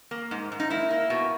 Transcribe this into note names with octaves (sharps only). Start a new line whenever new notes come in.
A#3
G#2
G#2
D#4
A#3 E4
A#3
B2